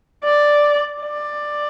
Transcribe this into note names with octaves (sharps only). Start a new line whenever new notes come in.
D5
D5